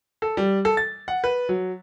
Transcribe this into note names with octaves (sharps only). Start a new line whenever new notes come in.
A4
G3
A4
A6
F#5
B4
F#3